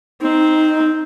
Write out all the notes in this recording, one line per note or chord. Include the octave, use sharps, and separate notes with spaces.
C4 D#4